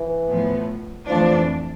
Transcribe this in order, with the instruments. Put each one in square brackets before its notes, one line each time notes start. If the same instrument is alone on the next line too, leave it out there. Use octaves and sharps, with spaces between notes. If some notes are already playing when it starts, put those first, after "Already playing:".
Already playing: [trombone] E3
[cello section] A2 F3 B3
[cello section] F2 E3 A3 D4 [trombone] F3